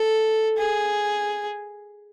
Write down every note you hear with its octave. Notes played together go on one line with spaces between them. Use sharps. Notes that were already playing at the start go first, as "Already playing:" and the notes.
Already playing: A4
G#4